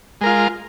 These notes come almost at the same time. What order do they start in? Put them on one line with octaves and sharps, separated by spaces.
G#3 A#4 F4